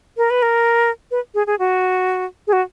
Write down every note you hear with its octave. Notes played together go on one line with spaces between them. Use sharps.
A#4
B4
A#4
B4
G#4
G#4
F#4
G#4
F#4